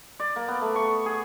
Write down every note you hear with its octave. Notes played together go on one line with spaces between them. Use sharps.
D5
A#3
B3
A3
C#6
G#4